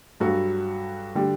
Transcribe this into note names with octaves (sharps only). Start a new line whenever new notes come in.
G2 F#3 F#4 A4
D3 G3